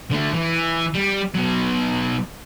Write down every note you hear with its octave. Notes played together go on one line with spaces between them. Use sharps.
D3 A3
E3
G3
B2 F#3